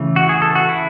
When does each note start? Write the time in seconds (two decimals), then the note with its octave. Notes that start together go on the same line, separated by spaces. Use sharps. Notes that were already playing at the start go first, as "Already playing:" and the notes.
Already playing: C#3 E3 A3
0.16 F#4
0.29 G#4
0.42 A4
0.55 F#4
0.69 E4